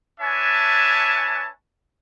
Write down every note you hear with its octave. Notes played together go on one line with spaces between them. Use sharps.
D4 B4 C#5 E5 G#5 A5